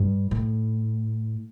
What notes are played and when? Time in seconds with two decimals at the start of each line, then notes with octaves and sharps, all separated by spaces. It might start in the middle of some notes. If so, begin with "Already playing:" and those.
Already playing: G2
0.31 A2